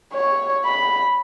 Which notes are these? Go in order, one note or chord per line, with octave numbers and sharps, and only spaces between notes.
C#5
B5